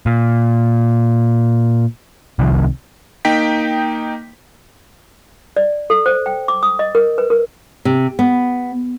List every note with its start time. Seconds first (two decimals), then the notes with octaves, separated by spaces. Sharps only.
0.06 A#2
2.39 C2 C3 D#3 F3
3.25 A#3 D#4 G5 B6
5.57 D5
5.90 A4
6.06 C5
6.26 G5
6.48 D6
6.63 D#6
6.79 D#5
6.95 A#4
7.18 B4
7.30 A#4
7.85 C3
8.19 B3